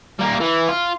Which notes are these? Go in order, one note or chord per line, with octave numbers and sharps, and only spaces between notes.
G3 A#3
E3
F4